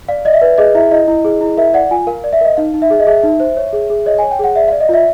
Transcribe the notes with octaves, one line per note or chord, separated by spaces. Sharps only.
D5 F5
D5 D#5
E5
B4
G#4 D#5
E4 E5
E4 D#5
E4
G#4
E4
A#4 E5
D5 F#5
F4 G#5
A#4 F5
D5
E5
A#4 D#5
D#4 F5
D#4
E5
G#4
D#5
G#4 E5
D#4
C5
C#5
G#4
G#4
C#5 D#5
C#5 G#5
G5
G#4 F#5
D5 E5
D5 F5
D#5
F4 E5